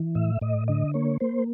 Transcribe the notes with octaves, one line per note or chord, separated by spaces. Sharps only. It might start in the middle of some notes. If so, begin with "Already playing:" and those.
Already playing: E3
A2 E5
A2 D#5
D3 D#5
A#3 C#5
A#3 C5